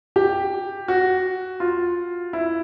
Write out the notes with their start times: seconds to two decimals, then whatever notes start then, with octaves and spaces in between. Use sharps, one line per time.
0.16 G4
0.88 F#4
1.60 F4
2.33 E4